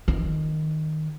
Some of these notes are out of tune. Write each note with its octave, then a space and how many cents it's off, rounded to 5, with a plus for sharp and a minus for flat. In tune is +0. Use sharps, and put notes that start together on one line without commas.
D#3 -5